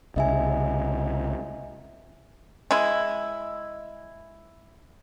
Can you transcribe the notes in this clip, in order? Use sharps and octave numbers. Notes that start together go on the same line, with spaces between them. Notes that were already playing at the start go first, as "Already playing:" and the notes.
C2 C#3 D#5 E5 G#5
G#3 E4